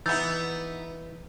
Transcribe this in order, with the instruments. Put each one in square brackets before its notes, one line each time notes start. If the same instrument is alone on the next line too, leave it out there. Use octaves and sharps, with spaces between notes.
[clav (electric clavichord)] E3 G#4 E5 [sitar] B3 D#4 [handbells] E6 G6 A6